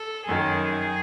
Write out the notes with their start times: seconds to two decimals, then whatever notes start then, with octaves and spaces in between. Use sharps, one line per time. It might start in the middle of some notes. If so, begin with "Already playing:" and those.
Already playing: A4
0.25 F#2 D#3 F#3 G#4